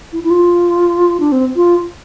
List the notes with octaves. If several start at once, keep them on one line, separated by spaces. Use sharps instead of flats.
E4
E4
F4
D4
C4
F4